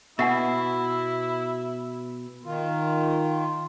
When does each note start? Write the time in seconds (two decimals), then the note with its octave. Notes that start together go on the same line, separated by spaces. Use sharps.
0.19 B2 E4 E5 F#5 G#5
2.45 D#3 F4